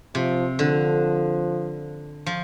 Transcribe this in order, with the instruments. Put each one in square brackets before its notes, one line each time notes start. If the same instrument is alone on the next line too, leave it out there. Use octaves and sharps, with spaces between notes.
[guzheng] C3 [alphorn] F3
[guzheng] D3 [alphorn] F3
[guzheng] F3